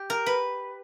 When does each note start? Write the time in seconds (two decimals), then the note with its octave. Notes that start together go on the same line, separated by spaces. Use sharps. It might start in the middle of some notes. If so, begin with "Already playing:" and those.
Already playing: G4
0.10 A#4
0.26 B4